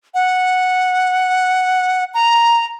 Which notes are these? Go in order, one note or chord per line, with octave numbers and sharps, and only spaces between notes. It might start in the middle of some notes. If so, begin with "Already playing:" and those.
F#5
A#5